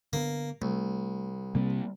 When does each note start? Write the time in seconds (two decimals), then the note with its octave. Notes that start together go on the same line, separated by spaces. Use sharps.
0.13 D3 A#3 B3
0.62 C2 A3
1.55 C3 G3 A#3 C4